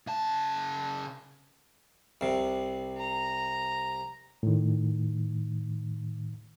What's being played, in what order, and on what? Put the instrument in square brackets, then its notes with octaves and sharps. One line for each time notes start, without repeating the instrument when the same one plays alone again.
[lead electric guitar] C#3 A5
[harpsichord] C2 C3
[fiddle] A#5
[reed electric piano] A2 D#3